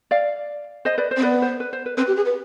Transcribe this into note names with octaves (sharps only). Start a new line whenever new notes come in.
D5 F5
C5 D#5
B4 D5
C5
C4
B3 B4 D5
C5
B4
C5
B4
C4 B4
G4
G#4
B4